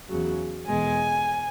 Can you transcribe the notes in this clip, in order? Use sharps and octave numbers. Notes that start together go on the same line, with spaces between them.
E2 C#3 F#3
E2 B2 G#3 G#5